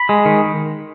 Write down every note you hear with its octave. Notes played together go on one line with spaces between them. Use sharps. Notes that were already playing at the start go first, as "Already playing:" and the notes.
Already playing: B5
G#3
D#3